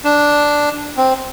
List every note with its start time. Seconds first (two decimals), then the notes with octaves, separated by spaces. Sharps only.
0.04 D4
0.97 C4